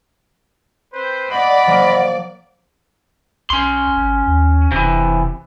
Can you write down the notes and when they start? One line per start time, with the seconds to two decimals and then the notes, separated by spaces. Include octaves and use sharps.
0.94 C4 B4 C5
1.31 D5 D#5 F#5 B5
1.67 F3 F#3 A#3
3.50 B1 C#4 C6
3.97 G#1
4.27 D#2
4.72 E1 C3 E3